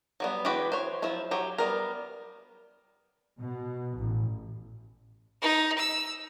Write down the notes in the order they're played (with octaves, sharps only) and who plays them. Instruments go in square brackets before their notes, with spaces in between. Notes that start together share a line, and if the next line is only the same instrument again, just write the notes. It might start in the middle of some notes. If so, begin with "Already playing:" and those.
[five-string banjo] F#3 G3 B3
E3 G#3 F#4 G4 B4
C5 C#5
F3 F#3 E4 F4
F#3 G4 C#5
G3 B3 A#4
[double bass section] B2
A1
[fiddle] D#4
E6